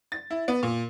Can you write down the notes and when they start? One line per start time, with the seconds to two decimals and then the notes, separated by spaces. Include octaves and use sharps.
0.12 A6
0.30 E4
0.48 B3
0.63 A#2